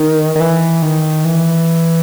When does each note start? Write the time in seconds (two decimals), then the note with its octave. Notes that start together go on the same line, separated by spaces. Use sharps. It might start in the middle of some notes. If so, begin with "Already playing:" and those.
Already playing: D#3
0.35 D#3
0.40 E3
0.82 D#3
1.25 E3